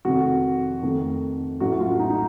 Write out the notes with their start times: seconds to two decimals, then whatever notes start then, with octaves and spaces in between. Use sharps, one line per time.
0.05 F1 F2 D#3 F#4
0.83 F2 D#3 A3
1.60 A1 A2 F#3 A3 F#4
1.72 F#4
1.80 F4
1.99 D#4
2.10 D#4